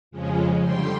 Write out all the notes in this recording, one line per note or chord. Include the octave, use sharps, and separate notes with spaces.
F2 C#3 F3 G#3 C#4
D3 G3 G5 C6